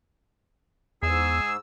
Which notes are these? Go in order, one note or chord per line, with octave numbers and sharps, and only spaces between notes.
E2 G#2 G#4 E6